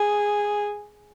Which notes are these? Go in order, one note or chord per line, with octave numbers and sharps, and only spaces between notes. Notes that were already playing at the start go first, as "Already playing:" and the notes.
Already playing: G#4